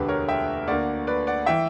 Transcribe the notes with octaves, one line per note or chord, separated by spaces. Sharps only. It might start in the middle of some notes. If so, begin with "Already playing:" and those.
Already playing: E1 D2 D3 G4 B4
A#4 C#5
E5 G5
D2 D3 A#3 D5 F#5
B4 D5
D5 F#5
E3 E5 G5